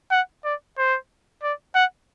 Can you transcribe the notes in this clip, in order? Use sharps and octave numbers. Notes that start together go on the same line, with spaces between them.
F#5
D5
C5
D5
F#5